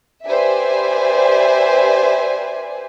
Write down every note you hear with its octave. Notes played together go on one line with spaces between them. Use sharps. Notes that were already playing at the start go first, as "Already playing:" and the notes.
G4 B4 C5 D5 E5 G#5